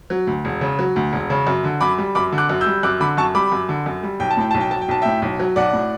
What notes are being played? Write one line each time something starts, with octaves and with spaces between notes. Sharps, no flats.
F#3
D2
E1
C#3
F#3
D2
E1
C#3
F#2
D3
F#2 B5 D6
G3
F#2 B5 D6
D3
D6 F#6
F#2
E6 G6
G3
F#2 D6 F#6
D3 B5 D6
F#2 A5 C#6
G3 B5 D6
F#2
D3
F#2
G3
B1 G5
A5
A2 G5
B1 A5
G5
F#3 A5
G5
B1 A5
A2 E5 G5
B1
F#3
B1 D5 F#5
A2